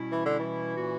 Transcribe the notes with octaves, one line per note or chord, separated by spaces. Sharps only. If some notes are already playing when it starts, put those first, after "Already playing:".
Already playing: B2 G3 C#4 E4
E3
D3
E3
A#2 A#3 C#4 F#4